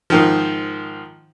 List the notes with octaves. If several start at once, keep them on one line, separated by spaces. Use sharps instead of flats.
G#2 D#3 F3